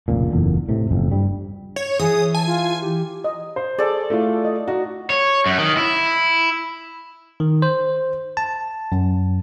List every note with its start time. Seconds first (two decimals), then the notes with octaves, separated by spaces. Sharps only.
0.08 F1 C#2 A#2
0.31 F#1 E2 A#2 D3
0.69 A2 C3
0.91 F#1 F2
1.11 G2 G3
1.76 C#5
1.99 E3 G#4 D#6
2.34 G#5 A5
2.46 F4
2.81 G4
3.24 D#5
3.56 C5
3.79 G#4 A4 D5
4.10 A3 E4 F4
4.45 D#5
4.68 D#4 F#4
5.10 C#5
5.46 F#2
5.58 D#3
5.77 E4
7.40 D#3
7.62 C5
8.37 A5
8.92 F#2